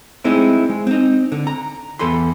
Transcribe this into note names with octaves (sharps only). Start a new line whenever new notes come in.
G#3 A3 C4 D#4 E4
G#3
C4 D#4
D3
A#5
E2 A4 B5 C6